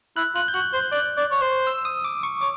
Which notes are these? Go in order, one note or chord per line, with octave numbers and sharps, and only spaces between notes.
E4 F#6
F4 F#6
G6
F#4 F#6
C5 G6
D5 F#6
D5
C#5
C5
E6
D#6
D6
C#6
C#5 D6